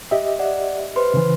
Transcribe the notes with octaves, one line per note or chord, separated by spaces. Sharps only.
G4 D#5 E5
D5 F#5
B4 C5 C6
C#3 E3